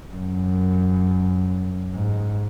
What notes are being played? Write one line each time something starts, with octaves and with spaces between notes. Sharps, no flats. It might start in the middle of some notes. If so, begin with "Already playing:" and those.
F#2
G#2